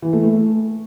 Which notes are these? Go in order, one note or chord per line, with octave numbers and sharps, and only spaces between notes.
E3
A3
A3